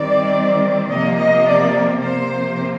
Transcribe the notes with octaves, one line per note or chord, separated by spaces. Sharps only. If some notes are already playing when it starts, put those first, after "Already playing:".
Already playing: D#3 G3 C4 D5
C3 F3 A#3 D#5
D#5
D5
C3 F3 A#3 C5